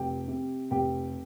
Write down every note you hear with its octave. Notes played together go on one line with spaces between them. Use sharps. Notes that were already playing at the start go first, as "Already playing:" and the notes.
Already playing: F1 G4 G5
C3
F1 G4 G5